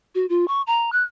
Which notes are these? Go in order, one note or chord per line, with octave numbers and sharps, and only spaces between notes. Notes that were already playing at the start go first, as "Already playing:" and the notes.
F#4
F4
C#6
A#5
F#6